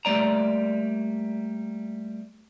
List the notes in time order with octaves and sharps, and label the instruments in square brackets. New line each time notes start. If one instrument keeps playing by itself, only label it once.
[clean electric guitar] G3 A3 A#3 D5 A#5